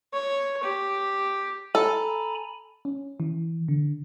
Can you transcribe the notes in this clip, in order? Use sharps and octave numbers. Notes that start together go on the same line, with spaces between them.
C#5
G4
A4 G#5 A#5 B5
C#4
E3
D3